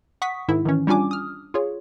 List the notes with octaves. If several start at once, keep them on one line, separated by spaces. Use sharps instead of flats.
F#5 C#6 D#6 B6
G#2 D#3 E4
D#3 E3 C#4
G3 C#4 D4 F4 G#5 D6
D#6 F6
F4 G#4 C#5